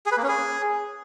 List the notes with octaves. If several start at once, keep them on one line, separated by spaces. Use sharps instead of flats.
G#4
B4
A#3
C#4
G#4